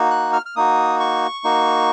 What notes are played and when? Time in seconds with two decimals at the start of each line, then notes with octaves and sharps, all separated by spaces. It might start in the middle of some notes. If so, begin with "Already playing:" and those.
Already playing: A#3 D#4 F#4
0.11 F#6
0.33 F6
0.46 F6
0.56 A#3 D#4 F#4 D#6
1.00 C#6
1.44 A#3 D#4 F#4